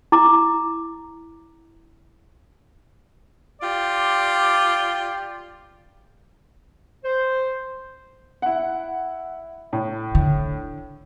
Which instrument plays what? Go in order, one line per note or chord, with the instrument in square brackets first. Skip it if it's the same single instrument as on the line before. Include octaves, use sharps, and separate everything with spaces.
[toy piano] E4 A#5 D6
[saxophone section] F4 G4 D5
[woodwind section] C5
[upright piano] E4 F#5
A2
[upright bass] D3